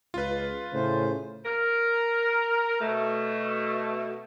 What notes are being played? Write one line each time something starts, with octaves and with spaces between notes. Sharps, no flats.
C#2 F4 B4
A2 C#3 C5
A#4
B2 A3